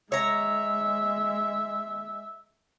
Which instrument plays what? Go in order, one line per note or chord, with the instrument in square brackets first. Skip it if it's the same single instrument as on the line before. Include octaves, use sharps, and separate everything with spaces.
[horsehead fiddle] G#3 [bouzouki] C#5 A#5 [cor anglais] E5